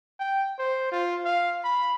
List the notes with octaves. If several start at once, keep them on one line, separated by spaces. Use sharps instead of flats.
G5
C5
F4
F5
B5